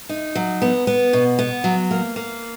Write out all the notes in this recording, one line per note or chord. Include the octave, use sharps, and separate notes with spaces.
D#4
F#3
B3
B3
B2
B3
F#3
A#3
A#3